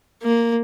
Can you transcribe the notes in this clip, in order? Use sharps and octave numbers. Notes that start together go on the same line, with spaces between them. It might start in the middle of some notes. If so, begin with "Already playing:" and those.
A#3